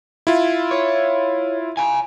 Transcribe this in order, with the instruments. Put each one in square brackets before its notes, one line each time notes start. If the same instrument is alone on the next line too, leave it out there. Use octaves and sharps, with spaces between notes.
[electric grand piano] E4 F4
[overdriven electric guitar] C#5
F5 G#5